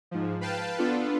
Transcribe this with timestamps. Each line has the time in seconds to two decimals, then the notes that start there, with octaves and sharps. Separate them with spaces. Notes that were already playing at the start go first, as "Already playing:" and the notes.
0.11 G#2 F3
0.41 B4 F5 G5 A5
0.78 B3 D4 F4 A4 B4